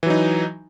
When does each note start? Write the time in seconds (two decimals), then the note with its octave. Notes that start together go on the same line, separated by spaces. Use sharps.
0.03 E3
0.06 F#3
0.10 D#4